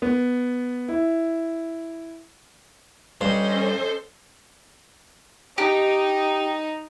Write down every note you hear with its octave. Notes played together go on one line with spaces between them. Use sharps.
B3
E4
G2 C#4 A4 C5 D#5
D#4 G4